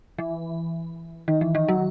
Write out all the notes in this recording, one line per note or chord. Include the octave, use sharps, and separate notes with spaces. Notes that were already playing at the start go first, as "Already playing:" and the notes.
E3
D#3
E3
D#3
F#3